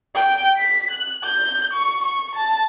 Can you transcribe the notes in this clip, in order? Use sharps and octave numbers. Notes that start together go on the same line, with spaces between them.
G5
B6
F#6
G6
C#6
C#6
A5